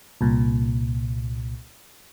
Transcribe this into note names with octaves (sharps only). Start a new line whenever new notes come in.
C2 A#2